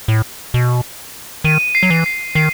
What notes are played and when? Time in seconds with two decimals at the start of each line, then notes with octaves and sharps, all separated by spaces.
0.08 A2
0.54 B2
1.44 D#3 D#7
1.75 C7
1.83 F#3
1.90 E3
2.06 C7
2.35 D#3 C7